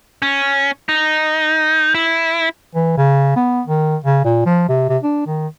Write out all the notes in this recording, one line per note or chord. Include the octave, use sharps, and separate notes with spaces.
C#4
D#4
E4
E3
C#3
B3
D#3
C#3
A#2
F3
C3
C3
D4
D#3